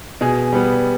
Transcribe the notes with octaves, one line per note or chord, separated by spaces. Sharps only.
B2 G#4
G3 B3